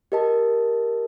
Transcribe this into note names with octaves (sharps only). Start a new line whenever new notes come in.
G4 A#4 D#5 A5